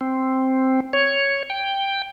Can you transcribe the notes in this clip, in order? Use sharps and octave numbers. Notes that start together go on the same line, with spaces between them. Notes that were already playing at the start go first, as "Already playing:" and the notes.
C4
C#5
G5